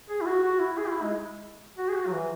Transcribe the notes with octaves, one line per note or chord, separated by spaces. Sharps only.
G#4
E4
F#4
F#4
E4
G#4
E4
G#3
F#4
G#4
F#4
F#3
E3